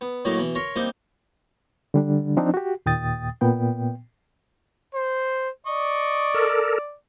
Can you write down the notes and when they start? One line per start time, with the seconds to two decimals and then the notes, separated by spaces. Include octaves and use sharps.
0.01 B3
0.25 A2 F#3 A3 A#3 D#5 A#5
0.38 B2 E3
0.55 A#4 C#5 A#5 C6
0.76 G3 A#3 C4 D#4
1.94 D3 G3 D4
2.37 F3 C4 D4 D#4
2.54 F#4 G4
2.86 D#2 A#2 G5 D#6 A6
3.41 A#2 B3 G5
4.95 C5
5.66 D5 D#5 C#6
6.34 A4 A#4